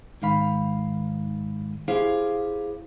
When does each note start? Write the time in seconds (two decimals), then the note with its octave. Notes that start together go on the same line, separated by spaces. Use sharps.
0.22 G#2 D#3 F5 B5
1.88 E4 G4 G#4 C5 F5